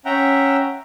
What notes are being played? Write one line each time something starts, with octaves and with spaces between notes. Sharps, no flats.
C#4 E5 F#5 G5 A#5